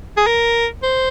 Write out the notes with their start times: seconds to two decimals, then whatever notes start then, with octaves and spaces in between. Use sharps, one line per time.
0.17 G#4
0.27 A#4
0.83 C5